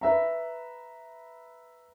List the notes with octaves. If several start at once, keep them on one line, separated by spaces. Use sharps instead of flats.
B4 E5 A#5